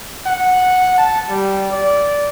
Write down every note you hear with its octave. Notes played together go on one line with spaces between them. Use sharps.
F#5
A5
G3
D5